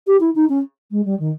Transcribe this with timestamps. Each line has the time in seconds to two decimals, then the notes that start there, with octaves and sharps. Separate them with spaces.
0.07 G4
0.20 E4
0.35 D#4
0.49 C#4
0.91 G#3
1.05 G3
1.19 D#3